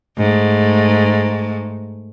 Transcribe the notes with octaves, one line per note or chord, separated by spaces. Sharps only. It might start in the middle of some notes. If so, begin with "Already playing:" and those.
G#2 A3